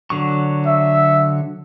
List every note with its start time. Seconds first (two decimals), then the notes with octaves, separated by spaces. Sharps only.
0.10 D3 F#3 C#6
0.66 E5